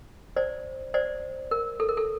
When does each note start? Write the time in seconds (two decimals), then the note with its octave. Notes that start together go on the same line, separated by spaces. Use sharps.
0.36 C5 D5
0.94 C5 D5
1.51 A#4
1.80 A4
1.89 A#4
1.97 A4